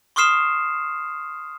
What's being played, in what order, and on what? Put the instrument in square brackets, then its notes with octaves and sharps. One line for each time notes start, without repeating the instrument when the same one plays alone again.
[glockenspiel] C6 C#6 D#6 F6 C7 E7